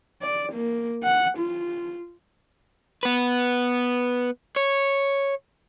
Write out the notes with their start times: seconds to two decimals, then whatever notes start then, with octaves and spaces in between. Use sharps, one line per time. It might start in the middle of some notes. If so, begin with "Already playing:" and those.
0.22 D5
0.53 A#3
1.04 F#5
1.39 F4
3.03 B3 B4
4.56 C#5